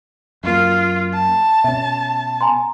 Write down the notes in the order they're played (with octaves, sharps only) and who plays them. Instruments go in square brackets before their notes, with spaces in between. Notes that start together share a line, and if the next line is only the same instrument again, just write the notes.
[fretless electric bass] F#2 A#3 [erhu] F4
[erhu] A5
[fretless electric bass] B2 C#4 [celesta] E5
[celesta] G#5 A#5 C6